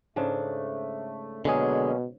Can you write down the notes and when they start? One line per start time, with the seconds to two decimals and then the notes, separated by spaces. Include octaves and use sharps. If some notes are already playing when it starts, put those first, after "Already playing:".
0.16 G#2 C#3 A3 D4
1.45 B2 D3 F#3 G#3 A#3 C#4 G#4